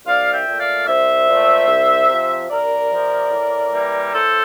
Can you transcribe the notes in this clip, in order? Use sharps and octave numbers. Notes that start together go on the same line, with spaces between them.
C2 D5 F5
E5 G5
A#2 A3
D5 F5
C2 C5 E5
A#2 A3
C2
C3 F3
C2 A#4 D5
C3 F3
A2
E3 G3 A#3
A2 A4 C5